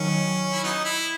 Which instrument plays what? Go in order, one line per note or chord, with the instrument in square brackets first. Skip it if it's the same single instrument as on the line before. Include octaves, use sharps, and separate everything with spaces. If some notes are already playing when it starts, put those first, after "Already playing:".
Already playing: [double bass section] D#3 F#3 [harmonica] C#4
[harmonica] E4
F#3 B3 D#4
E4